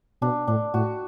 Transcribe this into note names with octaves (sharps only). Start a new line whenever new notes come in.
B2 D4
A2 D4
A2 F#4